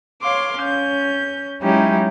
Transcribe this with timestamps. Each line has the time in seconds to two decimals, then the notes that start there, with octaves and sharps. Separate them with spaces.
0.22 C#5 F5 C6 D6
0.59 C#4 G6
1.62 F#3 G#3 C#4 D#4 E4 G4